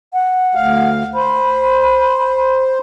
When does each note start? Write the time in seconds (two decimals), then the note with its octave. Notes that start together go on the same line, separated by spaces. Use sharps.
0.13 F#5
0.55 D2 F5
1.15 C5 B5